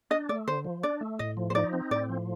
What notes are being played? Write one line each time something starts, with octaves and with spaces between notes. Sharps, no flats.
D4 D#5
A3 D5
D3 C5
F3
D4 D5
A3
A2 D#5
F3
C5
D#4 D5
C4
A2 D5
F3